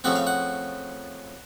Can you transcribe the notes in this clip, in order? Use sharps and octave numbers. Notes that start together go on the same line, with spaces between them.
C#3 F3 A3 C4 F#5
F5
F#5